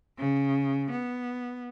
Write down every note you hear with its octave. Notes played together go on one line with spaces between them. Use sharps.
C#3
B3